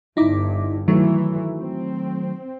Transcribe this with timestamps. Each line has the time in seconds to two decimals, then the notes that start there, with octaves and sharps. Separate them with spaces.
0.17 G1 G2 D#4 E4 D6
0.88 D#3 E3 F#3 A3
1.58 C4